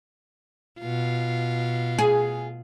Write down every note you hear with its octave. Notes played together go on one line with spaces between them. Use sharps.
B2 F4
G#4